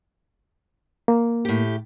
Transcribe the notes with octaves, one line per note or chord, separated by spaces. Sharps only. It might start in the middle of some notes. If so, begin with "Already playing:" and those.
A#3
A2 G4